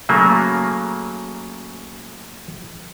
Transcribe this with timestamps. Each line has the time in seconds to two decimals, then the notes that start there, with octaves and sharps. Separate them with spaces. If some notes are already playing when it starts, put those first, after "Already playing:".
0.09 C#3 F#3 A3 A#3